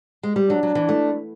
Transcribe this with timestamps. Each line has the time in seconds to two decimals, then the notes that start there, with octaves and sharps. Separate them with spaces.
0.23 G#3
0.36 G3
0.49 F#3 D4
0.63 F#3
0.75 E3
0.89 A3